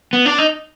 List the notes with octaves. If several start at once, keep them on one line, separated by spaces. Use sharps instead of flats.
B3
D4
D#4